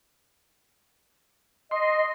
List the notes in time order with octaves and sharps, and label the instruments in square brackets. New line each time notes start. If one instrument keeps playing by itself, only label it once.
[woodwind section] D#5 [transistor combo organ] C6